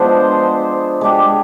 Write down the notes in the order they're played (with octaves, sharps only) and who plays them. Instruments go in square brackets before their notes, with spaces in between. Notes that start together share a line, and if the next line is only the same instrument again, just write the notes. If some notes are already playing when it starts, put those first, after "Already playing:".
Already playing: [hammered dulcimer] F3 G#3 B3 D4 [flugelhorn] C5
[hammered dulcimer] G#3 D4 G4